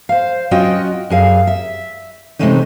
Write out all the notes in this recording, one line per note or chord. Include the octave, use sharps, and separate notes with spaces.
C5 F5
F#3 C#4 F4 F#4 D#5 G5
F#2 G#4 F5
E5
C3 E3 G#3 A3 C#4 D#4